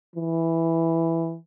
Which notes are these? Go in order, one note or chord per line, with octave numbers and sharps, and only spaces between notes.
E3